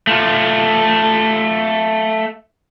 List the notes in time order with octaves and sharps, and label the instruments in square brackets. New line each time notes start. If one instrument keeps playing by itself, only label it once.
[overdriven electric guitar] A3 F4